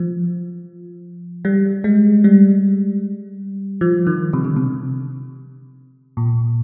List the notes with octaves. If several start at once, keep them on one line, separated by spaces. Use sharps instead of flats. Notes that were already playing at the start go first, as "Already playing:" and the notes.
Already playing: F3
G3
G#3
G3
F3
D#3
C3
D3
C3
A#2